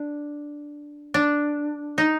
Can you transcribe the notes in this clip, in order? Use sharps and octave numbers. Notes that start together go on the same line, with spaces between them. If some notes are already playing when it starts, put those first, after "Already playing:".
Already playing: D4
D4
D#4